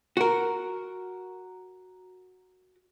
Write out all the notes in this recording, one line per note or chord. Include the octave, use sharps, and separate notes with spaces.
F#4 A#4